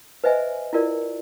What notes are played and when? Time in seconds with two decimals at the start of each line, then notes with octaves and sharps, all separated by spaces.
0.24 B4 C5 D#5 E5 G#5
0.73 E4 F4 A#4 D5